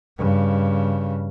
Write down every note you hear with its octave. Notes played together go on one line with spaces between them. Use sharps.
G2 C#3